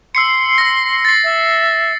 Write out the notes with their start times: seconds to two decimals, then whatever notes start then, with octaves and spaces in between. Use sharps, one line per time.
0.15 C6 E6 C7 C#7
0.58 E6 A#6
1.05 A6 C7
1.24 E5